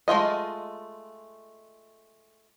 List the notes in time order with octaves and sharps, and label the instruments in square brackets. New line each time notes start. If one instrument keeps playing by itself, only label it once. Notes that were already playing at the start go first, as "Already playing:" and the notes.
[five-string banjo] G#3 A3 F4 D#5